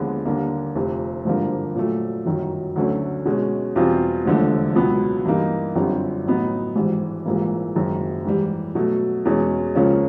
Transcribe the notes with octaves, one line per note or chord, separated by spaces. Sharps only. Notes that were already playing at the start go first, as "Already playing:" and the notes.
Already playing: D#2 D3 F3 G#3 B3
D#2 D3 G3 A#3
F1 F2 C3
G#1 G2 D3 F3 A#3
A#2 F#3 A3
G1 F#2 D#3 F#3
D2 D3 F#3 A3 C#4
B2 G#3 C#4
E2 B2 G3 C4 F4
E1 D#2 D3 F3 A3
C#2 B2 F#3 B3
G2 E3 G3 A#3 D#4
G1 F#2 D3 G3 C4
A1 A2 F#3 B3 D#4
G#1 G#2 E3 G3
A#1 G#2 E3 G3 A#3
F#1 F#2 D#3 G#3
G#2 E3 G3
B2 F#3 A3
E2 B2 G#3 C#4
C#2 C#3 F3 A#3 C#4